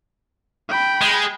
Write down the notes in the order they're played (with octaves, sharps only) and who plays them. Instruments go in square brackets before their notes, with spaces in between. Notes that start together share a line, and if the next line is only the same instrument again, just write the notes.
[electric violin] G5 B5
[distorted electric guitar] G#3